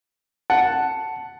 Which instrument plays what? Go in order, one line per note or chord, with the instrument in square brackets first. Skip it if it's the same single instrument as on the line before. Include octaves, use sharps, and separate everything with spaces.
[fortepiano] F#5 [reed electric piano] A5